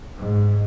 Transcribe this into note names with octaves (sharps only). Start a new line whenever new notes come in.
G#2